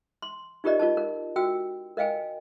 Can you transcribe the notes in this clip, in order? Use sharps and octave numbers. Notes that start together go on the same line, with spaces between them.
C6
D#4 F4 G4 A#4 D5 D#5
F4 A#4 D#5 A5
A#4
F#4 G5 E6
A#4 D#5 F5 G5 G#5